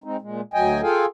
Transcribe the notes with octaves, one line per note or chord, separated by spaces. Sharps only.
G#3 C4 D#4
A#2 G#3
D2 F#3 D#5 G5 G#5
F4 G#4 A4 F5 G5 G#5